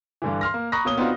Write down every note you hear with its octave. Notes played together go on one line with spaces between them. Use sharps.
G2 D3 E3
C6 F6 A#6
A#3
A#5 B5 C#6 D#6 F#6 A#6
B2 A#3 C#5 D#6 G7
B3 C4 D4 D#4 F4 F#4